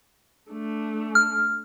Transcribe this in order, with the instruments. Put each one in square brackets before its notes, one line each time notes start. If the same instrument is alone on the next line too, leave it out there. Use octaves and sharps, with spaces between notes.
[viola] A3 D4
[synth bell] F6